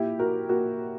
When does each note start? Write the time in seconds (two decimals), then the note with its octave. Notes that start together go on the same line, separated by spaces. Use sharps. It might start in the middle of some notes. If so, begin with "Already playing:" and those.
Already playing: A#2 E4 G4
0.19 F#4 A#4
0.49 A#2 F#4 A#4